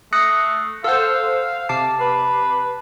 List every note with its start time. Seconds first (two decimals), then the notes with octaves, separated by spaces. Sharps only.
0.13 A3 D#6 F#6 A#6 C7 C#7
0.84 A4 C5 F5 F#5 E6
1.69 C3 A5 D6 C7
2.00 B4